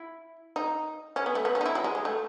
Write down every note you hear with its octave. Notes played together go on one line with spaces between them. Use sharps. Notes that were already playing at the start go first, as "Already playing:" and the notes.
Already playing: E4
D#4
C#4
B3
A3
B3
C#4
D#4
E4
F#3
G#3
G#3
A3